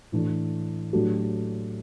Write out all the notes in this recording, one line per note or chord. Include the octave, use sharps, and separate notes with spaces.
A2 E3 A3 D4
A2 F#3 A3 D4 G4